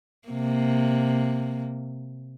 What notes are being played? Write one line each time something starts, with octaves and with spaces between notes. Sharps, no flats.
C3 A#3